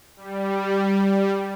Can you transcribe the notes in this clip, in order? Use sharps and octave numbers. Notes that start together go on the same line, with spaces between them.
G3